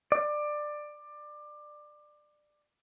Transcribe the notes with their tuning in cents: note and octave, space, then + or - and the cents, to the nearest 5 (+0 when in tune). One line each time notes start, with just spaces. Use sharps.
D5 +20